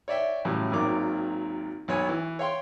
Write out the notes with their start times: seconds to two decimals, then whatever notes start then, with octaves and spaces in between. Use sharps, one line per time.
0.08 C#5 D5 E5 G5
0.45 A2 C#3 E3 F#3 G3
0.71 G#1 A#2 D#3 F#3 A#4 D6
1.88 B1 B2 C#5 G#5
2.08 E3
2.39 C#5 F5 G5 C6